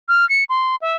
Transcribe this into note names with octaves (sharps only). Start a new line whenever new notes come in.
F6
C#7
C6
E5